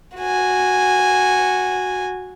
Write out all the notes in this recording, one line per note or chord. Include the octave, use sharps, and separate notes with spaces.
F#4 G#5